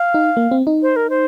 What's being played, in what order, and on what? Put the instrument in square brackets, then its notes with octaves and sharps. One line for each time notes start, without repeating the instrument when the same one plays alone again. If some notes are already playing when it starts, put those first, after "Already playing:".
Already playing: [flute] F5
[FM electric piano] D#4
A#3
C4
D#4
[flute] C5
A#4
C5